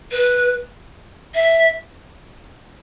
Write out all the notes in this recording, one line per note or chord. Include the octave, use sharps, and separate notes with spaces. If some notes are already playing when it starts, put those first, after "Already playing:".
B4
E5